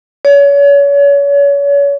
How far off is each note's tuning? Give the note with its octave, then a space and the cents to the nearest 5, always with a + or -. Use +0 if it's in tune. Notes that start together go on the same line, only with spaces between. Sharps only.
C#5 +35